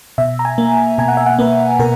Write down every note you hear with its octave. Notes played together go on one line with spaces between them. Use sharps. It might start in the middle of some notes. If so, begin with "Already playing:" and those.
B2 E5
A#5
G#5
A#3
B2 G#5
F#5
E5
F#5
A#3 B4
B2 A#4